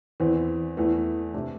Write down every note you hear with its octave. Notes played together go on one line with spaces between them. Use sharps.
E2 E3 C4
E2 E3 A3
C3 A3 D4